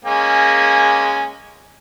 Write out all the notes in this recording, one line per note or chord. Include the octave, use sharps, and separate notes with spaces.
G#3 A#3 C#4